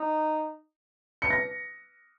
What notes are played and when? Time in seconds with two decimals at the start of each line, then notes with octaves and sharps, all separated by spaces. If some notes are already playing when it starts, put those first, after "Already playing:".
Already playing: D#4
1.22 C#7
1.30 A#6